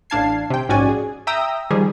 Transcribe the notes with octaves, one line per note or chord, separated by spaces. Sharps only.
A1 D4 F5 A5 G#6 C7
C3 G5
A#1 G#2 C#4 F#4 D5 G#5
G#4
E5 G5 A#5 D#6 E6 G6
D#3 F3 G3 G#4